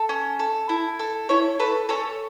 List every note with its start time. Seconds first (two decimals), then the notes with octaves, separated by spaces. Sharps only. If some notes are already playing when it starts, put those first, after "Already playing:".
Already playing: A4
0.09 C#4
0.39 A4
0.69 E4
0.99 A4
1.29 C#4 E4 C#5
1.59 A4 B4
1.89 C#4 A4 C#5